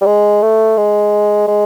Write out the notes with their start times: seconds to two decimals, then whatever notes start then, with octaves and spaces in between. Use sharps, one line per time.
0.01 G3
0.06 G#3
0.42 A3
0.77 G#3
1.48 G#3